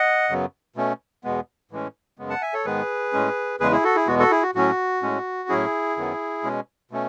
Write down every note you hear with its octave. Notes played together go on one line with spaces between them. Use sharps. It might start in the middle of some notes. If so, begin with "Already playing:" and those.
Already playing: D#5 F#5
F#2 C#3 F#3 B3
B2 A3 C#4
E2 B2 G#3 B3
A2 E3 G#3 C#4
F#2 C#3 G#3 B3
F#5 A5
E5 G#5
A4 C#5
G#2 D#3 G#3 B3 G#4 B4
A2 G#3 C#4
E2 C#3 G#3 G#4 B4
E4 G#4
F#4 A4
E4 G#4
E2 B2 G#3 B3 F#4
F#4 A4
E4 G#4
F#4
A2 F#3 C#4 F#4
A2 G#3 C#4
A2 F#3 C#4 E4 G#4
F#2 D#3 F#3 B3
B2 G#3 C#4
B2 A3 C#4